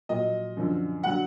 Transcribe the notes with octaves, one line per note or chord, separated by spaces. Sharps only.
A#2 F#3 D#5
F#2 D3 F3
D3 F#3 F#5